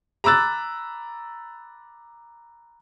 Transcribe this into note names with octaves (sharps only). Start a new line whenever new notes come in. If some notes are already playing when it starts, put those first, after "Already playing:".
A#5 B5 D6 E6 F#6 A6